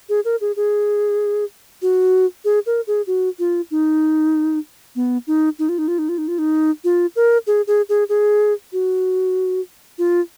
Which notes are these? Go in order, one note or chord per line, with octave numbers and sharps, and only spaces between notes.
G#4
A#4
G#4
G#4
F#4
G#4
A#4
G#4
F#4
F4
D#4
B3
D#4
D#4
F4
D#4
F4
D#4
F4
D#4
F4
D#4
F4
A#4
G#4
G#4
G#4
G#4
F#4
F4